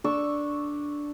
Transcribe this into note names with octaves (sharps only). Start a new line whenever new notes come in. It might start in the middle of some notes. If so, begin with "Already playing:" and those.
D4 A4 C#6 E6